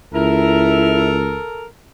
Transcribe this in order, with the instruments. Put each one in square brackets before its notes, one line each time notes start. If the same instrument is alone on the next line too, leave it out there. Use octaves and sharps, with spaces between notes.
[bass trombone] C#2 [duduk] E4 [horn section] A4 A#4